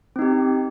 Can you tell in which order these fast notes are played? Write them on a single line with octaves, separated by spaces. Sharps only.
C4 D#4 G4